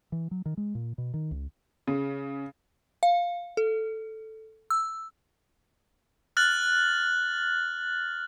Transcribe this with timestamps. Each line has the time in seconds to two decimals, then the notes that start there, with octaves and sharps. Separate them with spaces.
0.12 E3
0.31 F#3
0.46 D#3
0.57 G#3
0.75 A#2
0.98 B2
1.14 D#3
1.31 C#2
1.87 C#3
3.03 F5
3.57 A4
4.70 E6
6.37 F6 F#6 A6 F#7